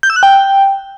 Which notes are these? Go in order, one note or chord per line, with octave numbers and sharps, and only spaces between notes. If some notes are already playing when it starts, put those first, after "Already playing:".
G6
E6
F#6
G5